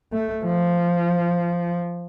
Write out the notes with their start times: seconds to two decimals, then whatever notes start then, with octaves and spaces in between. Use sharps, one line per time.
0.12 A3
0.44 F3